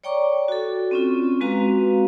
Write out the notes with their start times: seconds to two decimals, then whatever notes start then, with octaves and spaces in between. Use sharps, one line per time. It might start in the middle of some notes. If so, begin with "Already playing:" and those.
0.04 C#5 D5 G5 A#5 C#6 D6
0.48 F#4 A4
0.91 C4 C#4 F4
1.41 G#3 C4 F#4 B4 F5 A#5